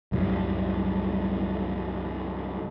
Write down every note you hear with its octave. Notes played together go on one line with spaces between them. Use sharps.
C2 F#2 A2 G3